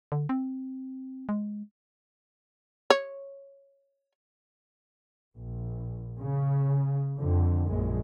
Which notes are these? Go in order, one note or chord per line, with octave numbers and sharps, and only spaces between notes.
D3
C4
G#3
C#5
A#1
C#3
F2 D3
A#1 F#2 G#3